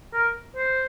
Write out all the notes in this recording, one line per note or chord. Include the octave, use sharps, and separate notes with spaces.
A#4
C5